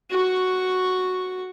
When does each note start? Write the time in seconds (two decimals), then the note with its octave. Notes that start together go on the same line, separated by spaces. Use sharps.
0.11 F#4 C#6